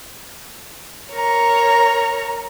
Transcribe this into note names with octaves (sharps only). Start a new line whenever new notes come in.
A#4 C#5 A#5